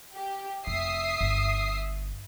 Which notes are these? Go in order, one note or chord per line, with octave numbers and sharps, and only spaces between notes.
G4
F1 C3 E5 D#6 C7
G1